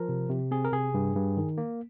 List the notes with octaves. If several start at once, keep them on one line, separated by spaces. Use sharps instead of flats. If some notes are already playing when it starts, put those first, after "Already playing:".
Already playing: F3 A#4
C3
C3
C4 G#4
A#4
C3 G#4
G2
G2
D#3
A#3